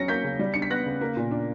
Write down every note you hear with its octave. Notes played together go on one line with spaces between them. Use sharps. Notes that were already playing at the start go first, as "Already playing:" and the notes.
Already playing: F#3 C#4 A#6 C#7
A#3 G6 B6
C#3
G3
D4 C#7
B6
B3 F#6 A#6
C#3
A#3
A#2
D4